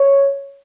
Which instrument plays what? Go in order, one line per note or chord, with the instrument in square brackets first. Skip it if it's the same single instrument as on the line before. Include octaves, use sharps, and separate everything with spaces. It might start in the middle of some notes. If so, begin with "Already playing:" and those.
Already playing: [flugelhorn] C#5